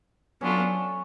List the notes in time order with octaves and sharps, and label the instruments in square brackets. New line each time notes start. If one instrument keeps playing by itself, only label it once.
[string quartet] F#3 B3 D4 F4 A4 [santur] C#4